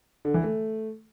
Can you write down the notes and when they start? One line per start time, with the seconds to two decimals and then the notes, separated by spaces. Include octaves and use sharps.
0.25 D3
0.34 E3
0.44 A3